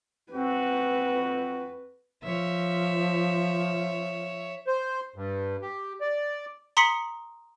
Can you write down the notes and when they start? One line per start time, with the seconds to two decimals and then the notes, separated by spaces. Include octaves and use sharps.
0.33 F2 C4 F#4 B4
2.24 F3 C#5 E5
4.67 C5
5.16 G2
5.62 G4
6.01 D5
6.77 A#5 C6 D#6 B6 C#7 F#7